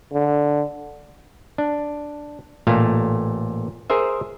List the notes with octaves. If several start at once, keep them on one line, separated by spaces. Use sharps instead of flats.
D3
D4
A1 A#2 A3 F5
G#4 A#4 C5 E5